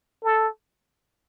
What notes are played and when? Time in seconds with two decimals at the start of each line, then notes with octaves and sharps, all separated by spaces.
0.24 A4